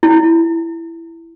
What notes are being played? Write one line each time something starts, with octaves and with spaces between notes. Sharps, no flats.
E4